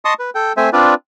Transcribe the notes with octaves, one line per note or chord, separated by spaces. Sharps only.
D#5 A5 C6 C#6 D#6
B4
A4 G5
A3 C4 C5 E5 G#5
C4 D4 F4 B4 D5